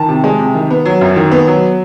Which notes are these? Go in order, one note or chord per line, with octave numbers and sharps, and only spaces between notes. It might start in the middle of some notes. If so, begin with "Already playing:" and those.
Already playing: D#3 A5
C3
G#3
C3
D#3
B3
F#3
F#2
D#3
B3
F#3